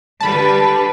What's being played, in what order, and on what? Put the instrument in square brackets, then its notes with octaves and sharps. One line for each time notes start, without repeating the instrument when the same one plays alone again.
[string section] D3 G3 B4 [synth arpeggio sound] A5 B5